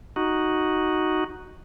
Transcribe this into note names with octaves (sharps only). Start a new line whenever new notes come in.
D#4 F#4